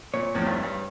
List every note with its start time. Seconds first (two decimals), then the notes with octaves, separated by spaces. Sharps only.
0.14 A#2 C#5
0.34 E2 A2 F3
0.46 G#1 C#2 G2
0.63 G2